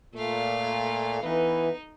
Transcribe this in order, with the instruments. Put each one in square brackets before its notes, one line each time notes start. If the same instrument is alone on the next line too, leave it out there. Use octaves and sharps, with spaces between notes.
[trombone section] A#2 [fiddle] A3 F5
[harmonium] E3 [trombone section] B3 E4 B4 [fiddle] D#4